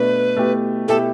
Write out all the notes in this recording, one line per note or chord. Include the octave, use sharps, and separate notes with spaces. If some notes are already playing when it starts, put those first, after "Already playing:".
Already playing: B2 A3 D4 B4
B2 A3 E4 G4
B2 A3 E4 G4 A4